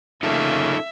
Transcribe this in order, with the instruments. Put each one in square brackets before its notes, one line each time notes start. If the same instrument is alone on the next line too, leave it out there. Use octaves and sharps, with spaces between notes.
[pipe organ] C#3 A#3 [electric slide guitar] D#4 F4 A4 [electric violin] E5